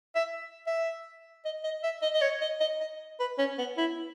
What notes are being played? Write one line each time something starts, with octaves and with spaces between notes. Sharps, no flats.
E5
E5
D#5
D#5
E5
D#5
D#5
C#5
D#5
D#5
D#5
B4
C#4
B3
E4